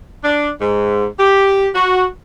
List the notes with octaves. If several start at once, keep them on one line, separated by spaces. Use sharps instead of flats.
D4
G#2
G4
F#4